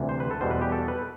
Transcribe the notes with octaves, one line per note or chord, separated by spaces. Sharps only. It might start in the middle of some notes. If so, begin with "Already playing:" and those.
Already playing: D2 C3 E3
C5
B4
A4
E2 B2 G3 C5
B4
G4
A4
B4